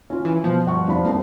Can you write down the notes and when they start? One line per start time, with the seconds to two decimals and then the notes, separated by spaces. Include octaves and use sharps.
0.10 C#4 F4
0.25 E3
0.44 B2 F3
0.66 G1 F#5 C#6
0.88 F1 D4 B5
1.05 F1 C2